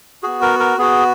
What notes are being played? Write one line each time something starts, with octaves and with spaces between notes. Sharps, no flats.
B3 F#4 G#4
A#4
A#4
B3 F#4 G#4